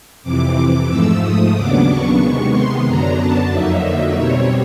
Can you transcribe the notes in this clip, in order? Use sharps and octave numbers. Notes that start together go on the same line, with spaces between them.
F2 C3 E3 D6
G#2 F3 A3 E6
D#6
D#2 C#3 F#3 B3 D4 D6
C#6
C3 D#3 G#3 B3
C6
F#2 D3 F#3 B3 D4 A#5
A5
F2 D3 F#3 A#3 D#4 E5
B2 G3 C4 C#5